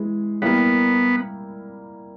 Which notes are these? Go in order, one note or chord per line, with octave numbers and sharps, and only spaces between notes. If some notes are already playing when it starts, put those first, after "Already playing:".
Already playing: E3 G#3
G3 A#3 B3 E4 A#4